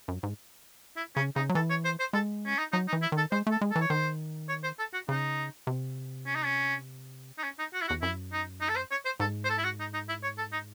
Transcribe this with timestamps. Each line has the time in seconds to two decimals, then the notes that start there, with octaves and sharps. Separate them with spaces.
0.08 F#2
0.23 G#2
0.96 E4
1.16 C#3 C#4
1.36 C#3 D#4
1.49 F#3
1.55 E3 A4
1.70 C#5
1.85 C5
1.99 C5
2.13 G#3 A4
2.46 C#4
2.58 D#4
2.72 F#3 D#4
2.88 D#4
2.93 E3
3.02 E4
3.12 D#3
3.17 A4
3.32 G#3 C5
3.47 A3 A4
3.61 G#3
3.71 A4
3.76 E3
3.81 C#5
3.90 D#3 C5
4.49 C#5
4.64 C5
4.79 A4
4.93 F#4
5.09 C#3 D#4
5.67 C3
6.26 C#4
6.36 D#4
6.45 C#4
7.38 D#4
7.43 C#4
7.59 D#4
7.74 F#4
7.81 E4
7.88 E2 F#4
8.02 F#2 E4
8.32 D#4
8.61 D#4
8.69 A4
8.76 C5
8.91 C#5
9.05 C5
9.20 G#2 A4
9.45 C5
9.49 A4
9.58 E4
9.64 F#4
9.79 D#4
9.94 D#4
10.09 E4
10.23 C#5
10.38 A4
10.52 D#4